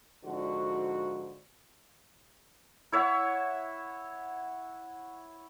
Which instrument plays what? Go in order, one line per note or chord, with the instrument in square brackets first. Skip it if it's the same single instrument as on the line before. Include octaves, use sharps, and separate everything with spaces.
[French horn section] G#2 D3 F3 F#4
[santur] E4 C#5 E5 F#5